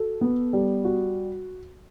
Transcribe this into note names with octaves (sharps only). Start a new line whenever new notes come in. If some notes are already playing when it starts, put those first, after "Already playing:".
Already playing: F#4 A4
B3
G3
F#4